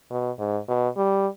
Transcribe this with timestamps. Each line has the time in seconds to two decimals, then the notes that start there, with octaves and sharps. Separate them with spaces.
0.11 B2
0.39 G#2
0.68 B2
0.97 G3